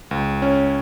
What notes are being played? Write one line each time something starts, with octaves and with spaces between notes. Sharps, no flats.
C#2
C#4